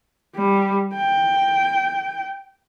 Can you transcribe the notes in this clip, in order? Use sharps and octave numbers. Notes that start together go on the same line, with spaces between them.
G3
G5